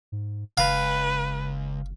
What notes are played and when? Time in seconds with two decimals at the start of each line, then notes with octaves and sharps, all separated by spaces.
0.12 G#2
0.58 F#1 C#2 B4 F5